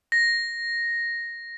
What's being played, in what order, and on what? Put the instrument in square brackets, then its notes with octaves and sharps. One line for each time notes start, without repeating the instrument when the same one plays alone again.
[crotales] A#6